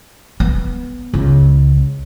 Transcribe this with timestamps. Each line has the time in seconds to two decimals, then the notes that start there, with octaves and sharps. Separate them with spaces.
0.40 B3
1.14 C#2